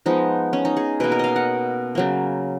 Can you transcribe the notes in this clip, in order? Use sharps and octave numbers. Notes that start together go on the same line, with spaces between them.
F3 G#3 B3 D#4
C#4
D#4
G#4
B2 A#3 B4
A#4
D#5 F5
F#5
C#3 F#3 A#3